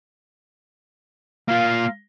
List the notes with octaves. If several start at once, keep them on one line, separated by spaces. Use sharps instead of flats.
A#3 F4 F5